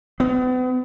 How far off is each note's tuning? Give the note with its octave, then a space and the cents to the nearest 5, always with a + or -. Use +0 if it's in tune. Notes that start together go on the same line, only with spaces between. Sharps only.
B3 +40